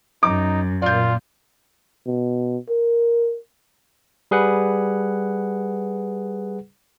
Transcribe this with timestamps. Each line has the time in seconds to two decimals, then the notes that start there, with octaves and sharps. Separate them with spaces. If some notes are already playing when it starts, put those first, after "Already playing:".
0.23 F#2 D#4 D6
0.82 A#2 F4 D5 G6
2.06 B2
2.69 A#4
4.31 G3 G#4 B4 F#5